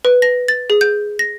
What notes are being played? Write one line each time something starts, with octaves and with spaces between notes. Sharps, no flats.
B4
A#6
A6
G#4
G6
A#6